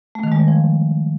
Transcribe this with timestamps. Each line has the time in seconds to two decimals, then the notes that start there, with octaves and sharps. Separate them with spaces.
0.15 A3
0.23 D#3
0.32 G#3
0.40 G3
0.48 F3